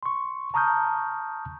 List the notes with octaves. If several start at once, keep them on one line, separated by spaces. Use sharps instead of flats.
C6 C#6
A5 A#5 C#6 D#6 F6 G6